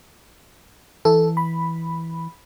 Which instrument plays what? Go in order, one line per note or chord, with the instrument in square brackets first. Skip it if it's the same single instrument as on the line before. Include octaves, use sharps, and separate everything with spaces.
[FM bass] E3 [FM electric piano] A4
[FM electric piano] B5